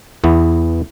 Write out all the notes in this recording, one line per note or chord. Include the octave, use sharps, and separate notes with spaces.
E2 E3 B3